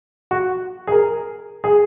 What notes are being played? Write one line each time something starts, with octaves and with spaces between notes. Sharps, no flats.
F#4
G#4
A#4
G#4